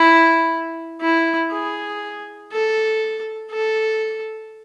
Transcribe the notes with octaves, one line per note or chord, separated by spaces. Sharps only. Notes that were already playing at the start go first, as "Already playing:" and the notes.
Already playing: E4
E4
G#4
A4
A4